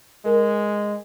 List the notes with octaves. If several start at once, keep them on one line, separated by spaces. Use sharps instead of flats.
G#3 A#4